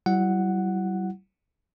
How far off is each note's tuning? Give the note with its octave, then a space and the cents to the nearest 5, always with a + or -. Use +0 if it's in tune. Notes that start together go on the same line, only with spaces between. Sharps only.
G3 -45 E4 +20 F#5 +0